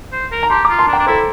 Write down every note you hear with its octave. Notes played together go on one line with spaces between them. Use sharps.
C5
A#4
A#5
G4 A5 C6
A#5 D6
F4
A5 C6
D4
G5 A#5
D4
E4 A4 C5